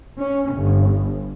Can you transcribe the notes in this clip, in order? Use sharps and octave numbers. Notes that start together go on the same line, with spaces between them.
C#4
G1